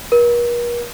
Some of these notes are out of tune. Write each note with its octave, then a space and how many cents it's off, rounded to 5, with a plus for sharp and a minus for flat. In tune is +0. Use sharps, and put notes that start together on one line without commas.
A#4 +45